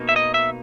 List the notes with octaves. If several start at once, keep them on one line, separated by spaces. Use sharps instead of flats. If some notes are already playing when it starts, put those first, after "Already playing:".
Already playing: B2 A#3 D#4
E5
D#5
E5